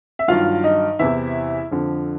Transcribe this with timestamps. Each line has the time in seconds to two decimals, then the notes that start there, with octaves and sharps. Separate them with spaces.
0.19 E5
0.28 G2 D#3 F#3 F4 F5
0.64 D#4 D#5
0.99 E2 C3 E3 E4 E5
1.71 F2 D3 F3